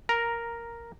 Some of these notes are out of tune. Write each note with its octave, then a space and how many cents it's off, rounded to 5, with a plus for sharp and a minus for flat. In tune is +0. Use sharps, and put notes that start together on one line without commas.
A#4 +0 A#5 +10